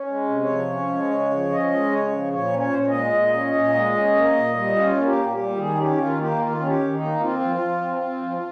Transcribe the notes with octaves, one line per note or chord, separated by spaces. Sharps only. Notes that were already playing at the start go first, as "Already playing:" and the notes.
Already playing: C#4
G#3
C3
C#5
F3
C#4
G#3
C#3
F3
C#4 D#5
G#3
C#3 C#5
F3
A#2 C#5
C#4
C#5
A#2 C5
C#5
D#5
G#3
A#2
C#4
A#2
G#3
C#4
A#3
A#2
G3
C#4 F4
A#3
G4
A#2
G4
G3
D#3 G#4
C#4 G4
D#3 F4
A#3 G4
D#3 F4
C#4
G4
D#3
D#4
A#3
C4 F4
F3
F3
C4
C4
F3